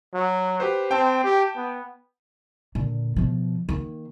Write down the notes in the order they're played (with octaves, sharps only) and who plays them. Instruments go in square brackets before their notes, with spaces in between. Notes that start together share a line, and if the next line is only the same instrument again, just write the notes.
[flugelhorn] F#3
[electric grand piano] G4 B4 C5
[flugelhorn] C4 [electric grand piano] G5 A5
[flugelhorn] G4
B3
[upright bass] A#2 D3
B2 F3
D#3 A#3